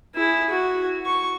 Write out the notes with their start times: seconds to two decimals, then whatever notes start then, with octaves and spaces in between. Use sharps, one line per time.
0.15 E4 G#4
0.49 F#4
1.06 C#6